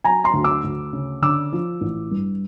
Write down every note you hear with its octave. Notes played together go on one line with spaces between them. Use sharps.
F#3 G#5 A#5
A#5 C6
D2
D6 E6
D2
C#3
D3 D6 E6
F3
A1
G2